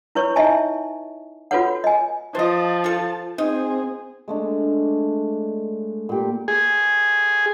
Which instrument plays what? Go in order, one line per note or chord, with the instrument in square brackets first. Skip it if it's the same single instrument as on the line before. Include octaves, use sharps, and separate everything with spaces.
[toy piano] E4 B4 C#5 C#6
D#4 E4 D#5 E5 G#5 A5
F4 F#4 A4 B4 C#5 F#5
D#5 G#5
[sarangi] F3 [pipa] C5 D#5 [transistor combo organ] A5
[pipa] F4 A4
[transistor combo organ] C4 [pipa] D#4 [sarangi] G#4
[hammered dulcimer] G#3 A3 D4
A#2 G4
[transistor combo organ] G#4